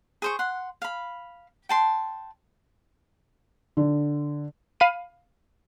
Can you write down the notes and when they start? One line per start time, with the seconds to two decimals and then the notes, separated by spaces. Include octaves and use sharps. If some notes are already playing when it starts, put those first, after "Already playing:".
0.22 G#4 C5 C#6
0.39 F#5 C6
0.82 F5 B5
1.69 G5 A5 C6
3.77 D3
4.80 F5 B5 D#7